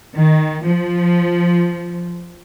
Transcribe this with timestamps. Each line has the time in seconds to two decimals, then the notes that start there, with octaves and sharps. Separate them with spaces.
0.17 D#3
0.66 F3